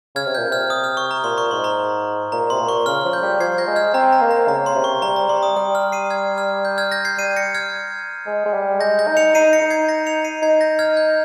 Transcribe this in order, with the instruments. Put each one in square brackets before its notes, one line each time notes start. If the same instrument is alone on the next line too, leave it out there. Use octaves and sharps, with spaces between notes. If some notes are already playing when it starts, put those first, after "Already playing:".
[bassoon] C#3 [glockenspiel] F6 G#6
[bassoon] C3
[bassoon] A#2 [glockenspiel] G6
[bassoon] C3 [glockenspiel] F6
[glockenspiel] D#6
F6
C#6
A#5
[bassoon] A#2 [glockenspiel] C6
[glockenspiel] C#6
[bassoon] G#2 [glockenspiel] C6
[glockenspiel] A#5
[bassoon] A#2 [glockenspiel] A#5
[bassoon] C3 [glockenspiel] C6
[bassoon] A#2
[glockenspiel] C#6
[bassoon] C#3 [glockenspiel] F6
[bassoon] F3
[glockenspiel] G6
[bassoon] G3
[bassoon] F3 [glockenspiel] G#6 C7
[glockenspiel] G6 A#6
[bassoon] G#3
[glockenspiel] F6 G#6
[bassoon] C4 [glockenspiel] A#5
[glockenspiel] A#5
[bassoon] A#3
[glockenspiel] A#5
[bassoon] C#3 [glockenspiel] A#5
[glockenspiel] C6
[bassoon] C3
[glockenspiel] C#6
[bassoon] G3 [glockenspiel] A#5
[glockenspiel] A#5
[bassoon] G3 [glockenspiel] C6
[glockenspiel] D#6
[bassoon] G3 [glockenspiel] D#6
[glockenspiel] F6
C7 D#7
F6 G#6
F6 G#6
G6
F6 G#6
G6 A#6
G#6 C7
[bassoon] G3 [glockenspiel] C7 D#7
[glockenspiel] A#6 C#7
F6 G#6
[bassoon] G#3
G#3
G3
[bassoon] G#3 [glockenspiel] G6 A#6
[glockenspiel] G6 A#6
[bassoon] D#4
[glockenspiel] C#7 F7
[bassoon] D#4 [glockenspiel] C7 D#7
[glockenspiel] A#6 C#7
[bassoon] D#4
[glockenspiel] G#6 C7
A#6 C#7
C#7 F7
C7 D#7
[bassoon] D#4 [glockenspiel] G#6 C7
[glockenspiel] G6 A#6
F6 G#6
G6